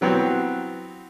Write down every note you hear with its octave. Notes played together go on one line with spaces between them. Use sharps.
E3 F#3 B3 C4